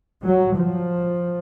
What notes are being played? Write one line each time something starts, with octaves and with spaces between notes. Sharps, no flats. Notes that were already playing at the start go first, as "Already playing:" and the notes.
F#3
F3